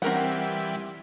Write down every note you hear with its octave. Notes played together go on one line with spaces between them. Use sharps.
E3 G3 C4 A#4 F#5